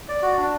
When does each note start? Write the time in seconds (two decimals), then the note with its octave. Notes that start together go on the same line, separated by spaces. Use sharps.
0.09 D5
0.22 F#4
0.38 D4